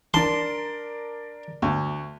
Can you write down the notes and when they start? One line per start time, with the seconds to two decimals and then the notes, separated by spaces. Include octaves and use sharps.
0.14 D4 A#4 A5 C6
1.62 D2 C#6